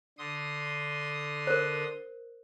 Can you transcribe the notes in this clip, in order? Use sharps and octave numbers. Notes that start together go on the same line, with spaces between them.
D3 C6 D#6
A#4 C5